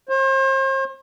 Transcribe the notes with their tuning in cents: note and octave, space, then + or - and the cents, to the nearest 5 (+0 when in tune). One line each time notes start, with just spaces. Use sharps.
C5 +40